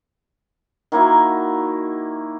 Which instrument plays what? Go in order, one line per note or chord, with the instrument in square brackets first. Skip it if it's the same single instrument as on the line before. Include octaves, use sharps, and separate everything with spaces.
[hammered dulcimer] D#3 A#3 E4 F#4